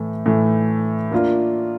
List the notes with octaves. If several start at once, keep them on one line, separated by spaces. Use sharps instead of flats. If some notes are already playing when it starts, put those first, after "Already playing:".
Already playing: A2 E3 A3
A2 E3 A3
A#3 D4 F4 A#4